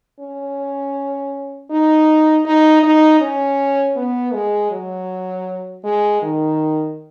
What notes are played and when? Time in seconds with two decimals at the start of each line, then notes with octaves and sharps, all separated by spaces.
0.20 C#4
1.71 D#4
2.45 D#4
2.83 D#4
3.21 C#4
3.96 B3
4.33 G#3
4.71 F#3
5.84 G#3
6.22 D#3